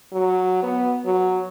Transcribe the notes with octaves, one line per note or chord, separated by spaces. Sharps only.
F#3
B3
F#3